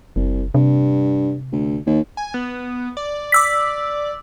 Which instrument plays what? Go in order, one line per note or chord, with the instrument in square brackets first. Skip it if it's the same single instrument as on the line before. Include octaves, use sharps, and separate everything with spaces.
[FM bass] F#1 [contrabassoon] C2
[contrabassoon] G2 [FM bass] C3
[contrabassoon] D2
D#2
[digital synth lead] G#5
B3
D5
[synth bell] D6 E6 B6